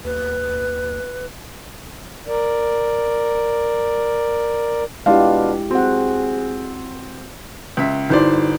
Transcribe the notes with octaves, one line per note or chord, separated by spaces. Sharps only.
D#2 B4
A#4 D5
B2 G#3 D4 E4 F4 G4 F5
C4 F#4 G#4 F#5
C#2 E5 B6
G1 D#4 E4 F#4 C5 D5